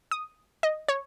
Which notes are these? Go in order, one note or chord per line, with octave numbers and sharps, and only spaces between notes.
D#6
D#5
C#5